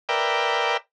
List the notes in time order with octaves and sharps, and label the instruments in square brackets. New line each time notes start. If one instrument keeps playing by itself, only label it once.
[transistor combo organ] A#4 B4 D5 E5 G5